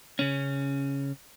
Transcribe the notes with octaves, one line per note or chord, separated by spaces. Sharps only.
C#3 C#4